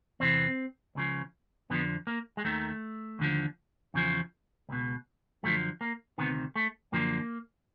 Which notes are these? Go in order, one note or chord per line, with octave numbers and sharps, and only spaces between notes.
E2 C3 E3 C4
C#2 C#3 F3
F2 D3 F3 B3
A#3
G#3
D#2 D#3 A3
D#2 D3 F3
E2 C#3 F3
C#2 B2
F#2 D3 F3 A3
A#3
D2 C3 D#3 B3
A3
F#2 D3 F3 A#3